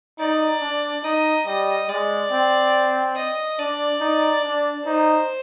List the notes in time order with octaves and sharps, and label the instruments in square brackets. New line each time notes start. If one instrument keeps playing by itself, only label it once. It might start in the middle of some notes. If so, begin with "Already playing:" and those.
[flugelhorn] D#4 [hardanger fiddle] D5
[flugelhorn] D4
[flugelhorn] D#4 [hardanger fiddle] D#5
[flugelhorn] G3 [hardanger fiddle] D#5
[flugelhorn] G#3 [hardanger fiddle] D5
[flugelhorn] C4
[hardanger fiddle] D#5
[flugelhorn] D4 [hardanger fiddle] D5
[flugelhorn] D#4
D4
[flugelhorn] D#4 [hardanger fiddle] C5